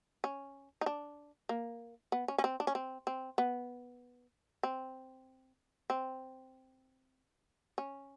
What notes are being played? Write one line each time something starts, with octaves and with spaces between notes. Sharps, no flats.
C#4
D#4
D4
A#3
B3
C#4
C#4
C4
D4
C#4
C4
C4
B3
C4
C4
C#4